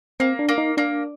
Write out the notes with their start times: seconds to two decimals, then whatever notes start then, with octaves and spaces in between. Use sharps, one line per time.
0.20 A#3 C4
0.39 D4
0.49 A#3
0.58 D#4
0.77 A#3 D4